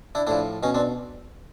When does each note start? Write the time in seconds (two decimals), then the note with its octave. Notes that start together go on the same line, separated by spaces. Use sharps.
0.15 D4 E4
0.27 A2 F3 D4 E4
0.63 B2 C#4 D#4
0.74 C4 D4